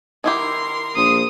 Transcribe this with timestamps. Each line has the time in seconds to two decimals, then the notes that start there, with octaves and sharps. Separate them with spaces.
0.24 D#3 E4 G4 A#4 C6
0.96 A#1 D#6